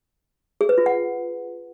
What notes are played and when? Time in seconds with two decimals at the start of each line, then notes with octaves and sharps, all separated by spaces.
0.61 G#4
0.69 B4
0.78 F4
0.86 F#5